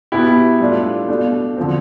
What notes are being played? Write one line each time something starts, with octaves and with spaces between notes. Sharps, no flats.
B2 B3 E4 G4
A2 G3 D4 F4 A4
B2 A3 D4
D3 F3 C4